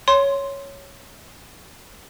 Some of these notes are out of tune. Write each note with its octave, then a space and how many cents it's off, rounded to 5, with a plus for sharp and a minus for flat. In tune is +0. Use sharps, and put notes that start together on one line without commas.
C#5 +0 C6 +0